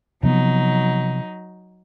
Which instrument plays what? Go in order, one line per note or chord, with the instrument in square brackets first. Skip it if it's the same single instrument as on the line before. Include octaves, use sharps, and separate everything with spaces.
[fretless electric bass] C3 F3 B3 [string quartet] F#3 D#4